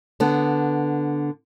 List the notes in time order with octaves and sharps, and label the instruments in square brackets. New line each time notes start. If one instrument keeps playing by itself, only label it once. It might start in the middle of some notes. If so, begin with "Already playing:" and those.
[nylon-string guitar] D3 B3